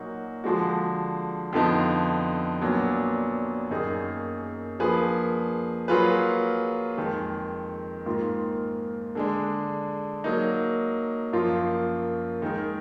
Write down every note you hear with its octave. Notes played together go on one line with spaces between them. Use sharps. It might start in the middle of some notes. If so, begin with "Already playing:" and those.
Already playing: A#2 F#3 A#3 D#4 F#4
D3 F3 G#3 D4 F#4
F2 D3 F3 B3 D#4
A#2 F#3 B3 D4
F#2 D#3 A#3 D#4 G#4
F3 A#3 D4 G#4 B4
F#3 A#3 F4 G#4 B4
F2 D#3 G#3
G#2 D#3 A#3 F4
D3 G#3 D4
F#3 A#3 D#4
F#2 F3 A#3 F4 A#4
D#3 G#3 D#4 A#4